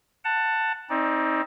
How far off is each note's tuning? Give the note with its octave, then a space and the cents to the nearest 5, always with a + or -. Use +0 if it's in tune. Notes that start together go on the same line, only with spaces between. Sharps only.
F#5 +0 A5 +15
C4 +25 D#4 +25 D5 +0